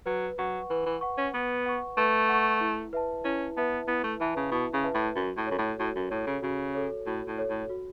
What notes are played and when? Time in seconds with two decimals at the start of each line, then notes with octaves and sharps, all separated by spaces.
0.06 F#3 B4
0.38 F#3 F#5 C#6
0.70 E3 B4
0.86 E3
1.01 F#5 C#6
1.17 C#4
1.34 B3 B4
1.66 F#5 C#6
1.97 A3 B4
2.29 F#5 C#6
2.61 E4
2.93 B4 E5 A5
3.24 C#4 E4
3.57 B3 B4 E5 A5
3.88 B3 E4
4.04 A3
4.20 E3 B4 E5 A5
4.36 C#3
4.51 B2 E4
4.73 C#3
4.84 B4 E5 A5
4.94 A2
5.15 F#2 F#4
5.37 A2
5.47 F#2 A4 C#5
5.58 A2
5.79 A2 F#4
5.95 F#2
6.10 A2 A4 C#5
6.27 C#3
6.42 C#3 F#4
6.75 A4 C#5
7.06 A2 F#4
7.28 A2
7.38 A4 C#5
7.49 A2
7.70 F#4